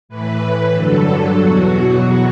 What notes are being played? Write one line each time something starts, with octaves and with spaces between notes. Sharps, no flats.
A2 E3 B4
G2 D3 F#3 A4
E2 B2 F#3 F#4